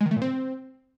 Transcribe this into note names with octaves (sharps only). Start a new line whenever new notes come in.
G#3
D#3
A3
A#2
C4